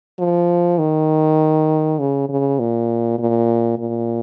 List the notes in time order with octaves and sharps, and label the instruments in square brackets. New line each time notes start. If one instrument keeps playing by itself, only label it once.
[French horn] F3
D#3
C#3
C#3
A#2
A#2
A#2